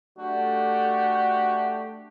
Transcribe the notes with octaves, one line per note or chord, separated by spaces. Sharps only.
A3 D4 F#4 G4